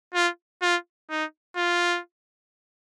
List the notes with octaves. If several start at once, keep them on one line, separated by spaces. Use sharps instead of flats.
F4
F4
D#4
F4